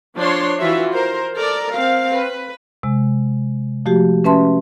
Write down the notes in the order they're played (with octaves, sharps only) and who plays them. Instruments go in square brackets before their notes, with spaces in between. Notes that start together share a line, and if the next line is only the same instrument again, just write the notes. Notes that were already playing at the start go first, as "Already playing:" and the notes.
[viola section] F3 D4 C#5 C6
E3 F4 F#4 E5
A#4 C5
A4 A#4 D5
C4 F5
B4
[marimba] C3 G#3
F3 A3 F#4 G4
C#4 B4 E5 A5 C6